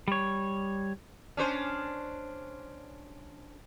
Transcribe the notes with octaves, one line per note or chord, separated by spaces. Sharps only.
G3 C#5
C#4 D4 C5